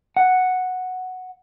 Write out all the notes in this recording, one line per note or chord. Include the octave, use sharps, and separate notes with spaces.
F#5